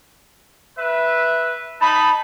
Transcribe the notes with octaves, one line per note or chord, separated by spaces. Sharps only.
B4 E5
D#4 A5 B5